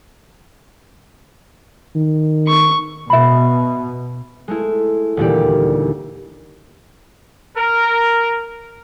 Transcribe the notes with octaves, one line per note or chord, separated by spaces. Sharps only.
D#3
C#6
B2 E5 B5
G#3 A3 E4
D#1 D2 A#2 E3 G4 D5
A#4